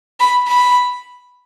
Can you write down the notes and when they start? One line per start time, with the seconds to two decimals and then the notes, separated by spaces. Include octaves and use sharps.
0.20 B5
0.48 B5